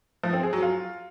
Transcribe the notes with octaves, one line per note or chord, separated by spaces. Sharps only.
F3
C4
G#4
F#3
F4